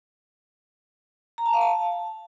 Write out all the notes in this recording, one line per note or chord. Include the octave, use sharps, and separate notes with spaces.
A#5
A5
F5
A5